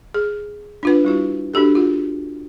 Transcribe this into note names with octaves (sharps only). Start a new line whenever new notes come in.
G#4
D4 F4 B4
G3 E4 F#4
D4 F#4 G4 A4
F4 F#4